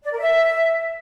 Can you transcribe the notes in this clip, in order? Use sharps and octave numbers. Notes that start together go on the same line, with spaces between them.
D5
A#4
E5